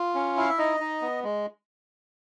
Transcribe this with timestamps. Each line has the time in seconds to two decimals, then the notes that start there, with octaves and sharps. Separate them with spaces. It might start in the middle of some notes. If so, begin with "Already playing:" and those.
Already playing: F4
0.15 C#4
0.37 E4 F5
0.49 E5
0.58 D#4 D#5
0.80 D#4
1.02 B3
1.24 G#3